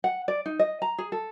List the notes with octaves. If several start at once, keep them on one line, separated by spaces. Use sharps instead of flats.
F#5
D5
D#4
D#5
A#5
G#4
A4